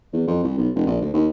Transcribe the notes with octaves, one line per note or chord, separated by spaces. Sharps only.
E2
F2
C2
B1
F1
A#1
D2
D#2